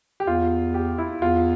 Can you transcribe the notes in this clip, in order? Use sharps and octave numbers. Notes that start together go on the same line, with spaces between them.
G4
E2 F4
G4
E4
E2 F4